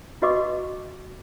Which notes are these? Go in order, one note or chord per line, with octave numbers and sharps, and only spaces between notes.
E4 F#4 B4 D#5 C#6 D6